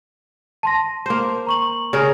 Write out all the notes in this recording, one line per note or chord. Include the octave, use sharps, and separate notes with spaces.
A5 C6 A#6
A#3 C5
A#5 C#6 F#7
C#3 A#4